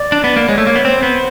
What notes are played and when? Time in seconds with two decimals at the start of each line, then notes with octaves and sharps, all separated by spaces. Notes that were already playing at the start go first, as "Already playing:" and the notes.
Already playing: D5
0.12 D4
0.24 B3
0.36 A#3
0.48 G#3 C#5
0.58 A3
0.67 A#3
0.75 B3
0.85 C4 C5
1.03 B3